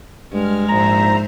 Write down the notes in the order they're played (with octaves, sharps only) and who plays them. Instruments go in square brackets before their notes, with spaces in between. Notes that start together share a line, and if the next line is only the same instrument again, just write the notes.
[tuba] G2 [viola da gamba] G#3 [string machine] F6
[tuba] A#1 [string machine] G#2 C5 E5 [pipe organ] A#5